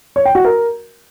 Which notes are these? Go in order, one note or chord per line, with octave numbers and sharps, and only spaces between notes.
C#5
G5
F#4
A#4